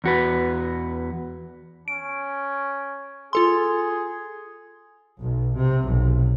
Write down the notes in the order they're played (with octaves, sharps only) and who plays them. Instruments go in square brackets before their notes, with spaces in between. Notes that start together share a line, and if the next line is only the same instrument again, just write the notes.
[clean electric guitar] E2 F#4 B4
[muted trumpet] C#4 [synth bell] D7
[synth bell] F4 A4 C6 [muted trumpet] G#4
[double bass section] B1
C3
B1